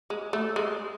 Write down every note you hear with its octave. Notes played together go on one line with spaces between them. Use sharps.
G#3
A3
G#3